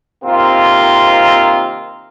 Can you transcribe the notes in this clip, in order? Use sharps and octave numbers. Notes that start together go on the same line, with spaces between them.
C3 D#3 A#3 C4 F4